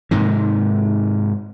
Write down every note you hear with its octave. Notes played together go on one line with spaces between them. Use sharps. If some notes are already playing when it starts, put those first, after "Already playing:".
G#2 C3 D#3